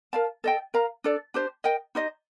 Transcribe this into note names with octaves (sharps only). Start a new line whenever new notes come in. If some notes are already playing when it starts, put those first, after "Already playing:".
A#4 F5 A5
A4 D#5 G5
A#4 F5 A#5
D4 A4 D5
D4 G4 C5
A#4 D#5 G5
D#4 G4 C5 D#5